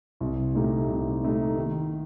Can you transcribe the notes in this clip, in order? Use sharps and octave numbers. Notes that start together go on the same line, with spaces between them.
C2
A#2 A3 D#4 G4
C2
A#2 A3 D#4 G4
D#3